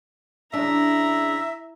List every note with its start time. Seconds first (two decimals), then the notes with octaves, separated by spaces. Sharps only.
0.54 C#3 D4 E4 E5 A#5